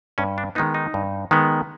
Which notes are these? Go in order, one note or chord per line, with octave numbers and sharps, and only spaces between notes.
G2 C#4
D4
D#3 G#3 B3 D#4
D#4
G2
D#3 G#3 B3